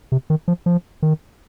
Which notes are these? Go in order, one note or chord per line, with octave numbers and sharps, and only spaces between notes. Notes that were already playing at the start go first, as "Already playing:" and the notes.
C3
D#3
F3
F3
D#3